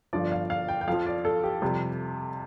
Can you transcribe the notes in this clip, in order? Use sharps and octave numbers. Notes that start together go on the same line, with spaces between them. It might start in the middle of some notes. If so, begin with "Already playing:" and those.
G1 G2 F3 D5
F5
F5
G5
G5
F2 F3 F5
D5
A4
G4
F2 C3 G3